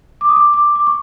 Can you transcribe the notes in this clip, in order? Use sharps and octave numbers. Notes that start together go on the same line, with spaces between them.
D6
D#6
D6
D6
D6
C#6